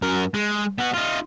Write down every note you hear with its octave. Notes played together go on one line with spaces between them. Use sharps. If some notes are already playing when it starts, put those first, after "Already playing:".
F#2 A#4
G#3
B3 F#4
D#4 F4